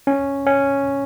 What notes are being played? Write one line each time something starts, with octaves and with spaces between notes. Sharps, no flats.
C#4
C#4